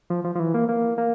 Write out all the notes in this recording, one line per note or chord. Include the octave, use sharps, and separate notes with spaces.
F3
F3
F3
E3
A#3
A#3
A#3